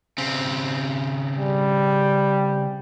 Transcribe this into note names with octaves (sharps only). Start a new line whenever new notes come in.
C#3 C4
G3